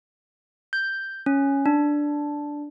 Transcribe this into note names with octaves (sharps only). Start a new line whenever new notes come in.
G6
C#4
D4